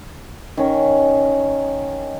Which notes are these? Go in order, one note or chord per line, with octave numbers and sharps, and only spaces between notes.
D#3 C#4